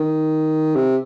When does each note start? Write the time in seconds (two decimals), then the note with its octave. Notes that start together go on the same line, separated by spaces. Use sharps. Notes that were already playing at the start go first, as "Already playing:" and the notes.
Already playing: D#3
0.76 C3